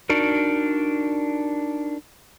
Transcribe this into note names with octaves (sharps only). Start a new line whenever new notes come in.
D4 D#4 F#4 A#4